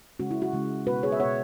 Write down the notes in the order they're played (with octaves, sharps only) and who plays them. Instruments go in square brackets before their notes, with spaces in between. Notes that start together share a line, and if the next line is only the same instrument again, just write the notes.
[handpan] C#3 G#3 C#4 F#4
E4
F#4
C#3 G#3 C#4
B2 B3 F#4 B4
G#4 C#5
E5
B2 B3 C#5 F#5